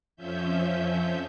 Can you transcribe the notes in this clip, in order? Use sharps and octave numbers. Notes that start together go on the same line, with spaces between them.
F2 F3 C#4 E5 G6